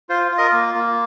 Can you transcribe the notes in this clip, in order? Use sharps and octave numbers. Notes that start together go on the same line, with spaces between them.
F4 C5
F4
A#4 D#5
A#3
A#3